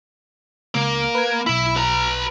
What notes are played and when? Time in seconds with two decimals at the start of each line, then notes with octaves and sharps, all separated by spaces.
0.74 C#2 A#3
1.15 B4 G#6
1.47 B1 E4 B5
1.76 B4 A#5